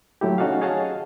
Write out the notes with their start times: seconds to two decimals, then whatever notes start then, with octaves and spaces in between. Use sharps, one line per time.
0.21 F#3 A3 E4 G4
0.38 C#4 D#4 F#4 A4 D#5 F5
0.61 G#4 C#5 D#5 F5 F#5 A5